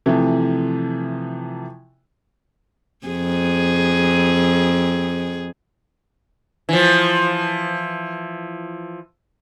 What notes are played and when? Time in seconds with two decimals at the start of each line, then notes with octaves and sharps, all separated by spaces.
0.06 C3 E3 F3 A3
3.07 F2 G#4
6.69 E3 F3